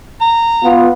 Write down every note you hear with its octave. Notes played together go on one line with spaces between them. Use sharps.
A#5
B3 F4